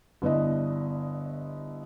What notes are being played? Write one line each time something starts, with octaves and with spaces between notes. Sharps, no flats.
G1 B3 D4 E4 D#5